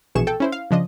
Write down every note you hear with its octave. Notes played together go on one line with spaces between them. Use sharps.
A#1 B2 E3 G#4 C#6 E7
A4 G5
C#4 E4 C5
F5
C#3 F3 D4 D#5